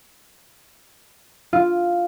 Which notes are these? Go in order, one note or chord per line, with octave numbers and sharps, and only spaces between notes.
F4